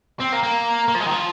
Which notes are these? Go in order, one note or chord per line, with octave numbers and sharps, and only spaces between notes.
C4
A#3
A#3
A#3
F3
G#3
D#3
F3